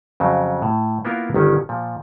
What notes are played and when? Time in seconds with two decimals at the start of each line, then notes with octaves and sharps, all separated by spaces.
0.20 F2 C#3 F#3
0.62 A2
1.05 A#3 B3 E4 F4 A#4
1.34 G1 D#3 C#4
1.69 A#2 F3